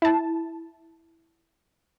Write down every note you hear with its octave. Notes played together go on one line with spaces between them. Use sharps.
E4 A5